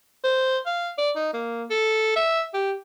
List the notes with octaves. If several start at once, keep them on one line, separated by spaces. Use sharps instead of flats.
C5
F5
D5
D#4
A#3
A4
E5
G4